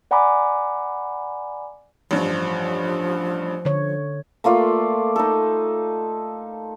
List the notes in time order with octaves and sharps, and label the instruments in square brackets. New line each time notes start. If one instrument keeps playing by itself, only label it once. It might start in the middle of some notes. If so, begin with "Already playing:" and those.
[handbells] D5 F#5 G#5 A#5 B5 D6
[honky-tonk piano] A1 G2 [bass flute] F3
[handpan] D3 C#5
[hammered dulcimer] A3 A#3 F4 D5
D#4 A4